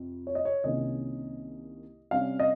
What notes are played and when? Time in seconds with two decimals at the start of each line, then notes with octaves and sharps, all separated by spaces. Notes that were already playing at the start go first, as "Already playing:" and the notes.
Already playing: F2 C3
0.27 C#5
0.35 D#5
0.45 C#5
0.64 C2 C3 D#3 A#3 C#4 D#5
2.11 C3 G3 C#4 F5
2.40 D#5